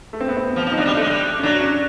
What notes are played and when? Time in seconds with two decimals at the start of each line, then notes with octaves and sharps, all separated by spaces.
0.13 A3
0.21 C4
0.28 B3
0.37 C4
0.56 F3
0.67 F3
0.71 D#4
0.77 F#3 D4
0.86 G3
0.94 A3
1.02 G#3
1.11 G3
1.38 C#4
1.43 F#3 D4
1.61 C#4